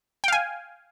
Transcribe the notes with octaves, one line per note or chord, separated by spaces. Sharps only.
F5 G5 G#5